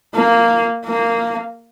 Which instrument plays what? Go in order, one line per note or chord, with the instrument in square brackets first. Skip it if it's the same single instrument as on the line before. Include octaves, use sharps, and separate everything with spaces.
[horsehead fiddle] A#3
A#3